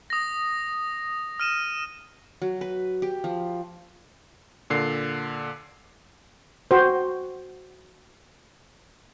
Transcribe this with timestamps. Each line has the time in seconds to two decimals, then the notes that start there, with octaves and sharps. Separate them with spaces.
0.10 D#6 A#6
1.40 F6 D#7 E7
2.42 F#3
2.61 B4
3.02 G4
3.24 F3
4.70 A#2 D3 C7
6.71 F#4 C5